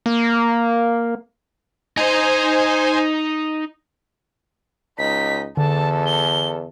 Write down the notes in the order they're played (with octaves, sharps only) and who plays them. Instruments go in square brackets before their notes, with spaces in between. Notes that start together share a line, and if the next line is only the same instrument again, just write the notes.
[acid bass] A#3
[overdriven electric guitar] D#4 D#5 [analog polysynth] C5 G#5
[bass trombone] C#2 [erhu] D#4 [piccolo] B6
[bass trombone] E2 [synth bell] D3 [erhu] A4 [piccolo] A5
[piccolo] G7